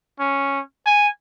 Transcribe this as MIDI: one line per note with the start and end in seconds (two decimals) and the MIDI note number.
0.20 0.60 61
0.86 1.09 80